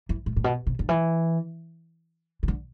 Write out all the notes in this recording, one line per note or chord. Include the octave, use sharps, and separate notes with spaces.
E3
A2
A2
B2
C3
D3
E3
C3
D3